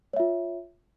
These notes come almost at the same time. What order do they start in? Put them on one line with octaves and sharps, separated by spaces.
C#5 E5 F4